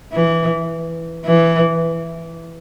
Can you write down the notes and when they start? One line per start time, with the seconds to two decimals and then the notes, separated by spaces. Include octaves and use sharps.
0.13 E3
1.25 E3